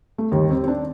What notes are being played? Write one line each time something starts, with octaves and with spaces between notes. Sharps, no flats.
A3
D#2 D#3 G3
C4
C4
D4